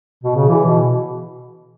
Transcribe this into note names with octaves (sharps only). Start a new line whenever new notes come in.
B2
C#3
E3
B2